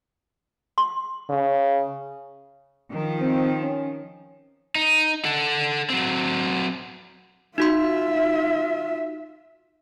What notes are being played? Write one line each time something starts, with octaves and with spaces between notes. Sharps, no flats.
C6
C#3
D#3 F3
C4
C#4
D#4
A4 F#5
F#3 C4
D#4 F4 F#4 E5 C6